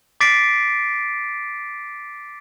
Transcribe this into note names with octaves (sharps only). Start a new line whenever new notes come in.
D6 A6 B6 C7 D7